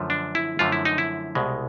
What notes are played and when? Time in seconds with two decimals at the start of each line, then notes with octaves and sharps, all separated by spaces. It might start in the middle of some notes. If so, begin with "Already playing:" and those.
Already playing: F#2 D3 F3 A3
0.10 D4
0.35 E4
0.59 F#2 D3 F3 A3 F4
0.72 E4
0.85 D#4
0.98 E4
1.35 C2 B2 G#3